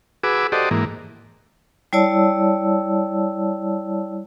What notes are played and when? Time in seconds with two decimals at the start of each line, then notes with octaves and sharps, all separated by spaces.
0.23 F#4 G#4 B4 D6 E6
0.52 F#4 G4 A4 C5 D5 D#5
0.71 G#2 E3 A#3
1.93 G3 E4 C#5 D5 A5 E6